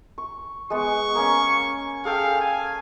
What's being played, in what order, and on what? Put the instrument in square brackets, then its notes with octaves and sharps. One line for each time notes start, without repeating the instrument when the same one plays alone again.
[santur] C#6
[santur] G#3 B3 [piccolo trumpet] C#6
[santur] A#3 C#4
[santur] G#4 A4 G5 [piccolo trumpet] F5
[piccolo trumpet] G#5